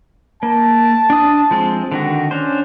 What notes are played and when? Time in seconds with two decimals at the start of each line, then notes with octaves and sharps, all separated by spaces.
0.43 A#3 A5
1.10 D4 D#6
1.51 F3 G#3 C4
1.92 D3 D#3 F#4
2.31 C#4 D4 C5